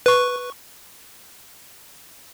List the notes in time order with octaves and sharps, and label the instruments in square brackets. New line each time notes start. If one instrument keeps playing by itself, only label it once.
[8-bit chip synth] B4 C#6